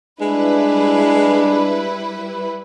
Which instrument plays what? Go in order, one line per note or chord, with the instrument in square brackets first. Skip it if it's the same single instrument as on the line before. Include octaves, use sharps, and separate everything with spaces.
[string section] G3 E4 B4 [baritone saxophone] G#3 [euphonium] D4